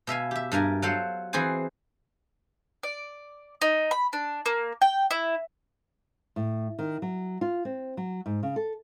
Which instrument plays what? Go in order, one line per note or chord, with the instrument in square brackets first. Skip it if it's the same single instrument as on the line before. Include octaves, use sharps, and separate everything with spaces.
[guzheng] B2 E5 F5 G#5
G4 E5
G2 G3 A#4 G#5
F#3 F4 A4 C5 F#5
E3 C4 G#4 B4 C5 G#5
[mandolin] D5
D#4
B5
D4
A#3
G5
E4
[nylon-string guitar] A2
D#3
F#3
F4
C4
F#3
G#2
C#3
A4